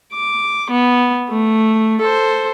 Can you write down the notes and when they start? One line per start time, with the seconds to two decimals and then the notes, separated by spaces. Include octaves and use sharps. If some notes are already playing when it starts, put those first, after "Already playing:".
0.14 D6
0.71 B3
1.30 A3
2.02 A4 C5